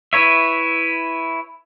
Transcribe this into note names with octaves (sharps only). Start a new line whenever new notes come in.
E4 B4 C#5 E5